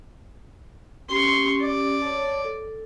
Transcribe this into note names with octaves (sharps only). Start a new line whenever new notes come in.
C#4 G4 C6 C#6
D5
C#5 A5
A4